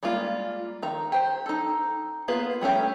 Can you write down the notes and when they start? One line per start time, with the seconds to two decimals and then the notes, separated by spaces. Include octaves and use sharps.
0.03 G3 G#3 A#3 F4
0.83 D#3 A#5
1.12 G4 C5
1.46 D#4 A4
2.28 A#3 B3 F4 G#4 B4
2.61 G3 A3 C#4 G4